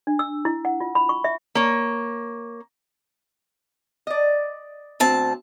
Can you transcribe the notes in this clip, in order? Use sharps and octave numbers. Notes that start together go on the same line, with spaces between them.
D4
E6
E4
F#5
F4
B5
C#6
E5
A#3 C#5
D5 D#5
D2 C4 A5